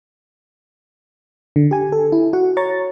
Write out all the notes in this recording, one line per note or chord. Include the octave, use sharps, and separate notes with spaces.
D3
G4 G#5
A4
E4
F#4 F#5
C#5 A#5 C#6 A6